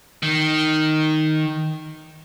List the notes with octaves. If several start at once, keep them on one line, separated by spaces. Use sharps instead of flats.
D#3